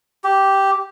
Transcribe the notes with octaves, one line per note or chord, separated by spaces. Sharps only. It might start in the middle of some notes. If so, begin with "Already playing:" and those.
G4